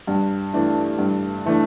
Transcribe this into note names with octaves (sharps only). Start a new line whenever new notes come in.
G2
E3 A3 D4
G2
E3 A3 D4